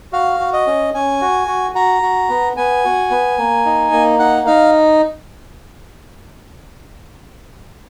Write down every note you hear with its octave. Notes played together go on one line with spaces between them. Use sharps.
F#4 F5
F#4
D#5
C#4
C#4 G#5
F#4
F#4
F#4 A#5
F#4
B3
B3 G#5
F#4
B3
A#3
D#4
A#3
D#4 F#5
D#4 F5